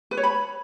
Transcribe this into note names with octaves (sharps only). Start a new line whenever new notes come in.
B4
C#5
B5